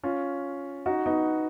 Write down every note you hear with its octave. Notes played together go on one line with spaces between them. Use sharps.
C#4 F4
D#4 F#4
B3 D#4